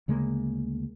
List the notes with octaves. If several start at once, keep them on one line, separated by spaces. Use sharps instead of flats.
D2 C#3 G#3 A#3